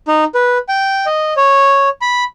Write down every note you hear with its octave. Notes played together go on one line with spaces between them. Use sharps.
D#4
B4
G5
D#5
C#5
B5